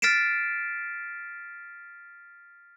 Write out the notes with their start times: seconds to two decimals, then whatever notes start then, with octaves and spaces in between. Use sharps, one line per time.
0.02 F6 A6 B6 C7 D7 E7